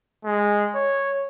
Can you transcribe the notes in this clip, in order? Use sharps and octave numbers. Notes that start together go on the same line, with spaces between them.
G#3
C#5